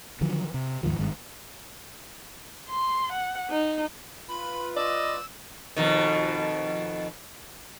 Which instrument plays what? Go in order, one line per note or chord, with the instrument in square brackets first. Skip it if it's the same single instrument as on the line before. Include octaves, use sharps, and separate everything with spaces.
[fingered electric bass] D3 D#3 F3 F#3
C3
D#2 G#2 D#3 F3
G#1 G2 D#3 G#3
[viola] C6
F#5
D#4
[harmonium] F4 B4 [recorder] B5
[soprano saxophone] D5 [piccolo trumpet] D#5 [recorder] E6
[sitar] F2 B2 D#3